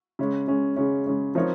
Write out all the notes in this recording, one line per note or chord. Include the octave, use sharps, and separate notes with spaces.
C#3 G#3 C#4
C#3 G#3 C#4
C#3 G#3 C#4
C#3 G#3 C#4
F3 C4 D#4 A#4 C#5